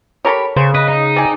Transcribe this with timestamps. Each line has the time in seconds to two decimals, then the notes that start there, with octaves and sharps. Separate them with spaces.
0.25 G4 A4 A#4 C#5 B5
0.56 C#3 C5 G#5 C#6
0.74 B4 D#5
0.88 D#4
1.16 C4 G#4 D5